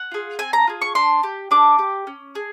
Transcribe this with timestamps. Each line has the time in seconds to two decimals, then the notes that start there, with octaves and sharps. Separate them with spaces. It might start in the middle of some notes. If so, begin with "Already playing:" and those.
Already playing: F#5
0.11 F4 G#4
0.39 C4 G#5
0.53 A#5
0.67 F4 G#4
0.82 C#6
0.95 D4 C6
1.23 G4
1.51 D4 D6
1.79 G4
2.07 C#4
2.35 G#4